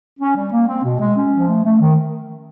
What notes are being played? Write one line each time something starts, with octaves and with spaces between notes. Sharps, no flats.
C#4
G3
A#3
C4
B2
G#3
C#4
F3
A3
A3
D#3